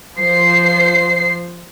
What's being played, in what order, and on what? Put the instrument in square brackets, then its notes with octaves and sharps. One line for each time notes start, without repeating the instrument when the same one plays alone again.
[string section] F3 C5 C7